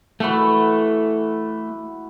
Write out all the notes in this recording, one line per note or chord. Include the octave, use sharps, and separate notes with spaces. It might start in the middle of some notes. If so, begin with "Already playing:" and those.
E3 A3 F#4 A4